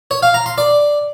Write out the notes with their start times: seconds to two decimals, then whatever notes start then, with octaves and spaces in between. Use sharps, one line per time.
0.11 C#5
0.23 F5
0.34 A#5
0.46 C6
0.58 D5